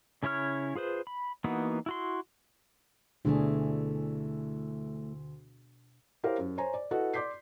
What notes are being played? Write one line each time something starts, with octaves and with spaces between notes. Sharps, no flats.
C#3 C#4 E4 C#5 F6
F4 G#4 B4 C5
B5
E3 A#3 B3 D#4 F#4
E4 F#4 C6
D2 B2 E3 A3 D4 G#4
E4 G4 A#4 C5 C#5 F5
F#2
C5 C#5 G#5 A#5
D5
E4 F#4 A4 B4 D#5 F#5
D5 C6 D6 G6 B6 C7